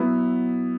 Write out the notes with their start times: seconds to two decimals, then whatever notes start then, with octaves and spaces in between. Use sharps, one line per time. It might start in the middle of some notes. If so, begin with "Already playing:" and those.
Already playing: F#3 B3 E4